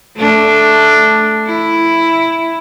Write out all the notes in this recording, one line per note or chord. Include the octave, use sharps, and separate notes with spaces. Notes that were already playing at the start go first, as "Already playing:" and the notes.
A3 D4
E4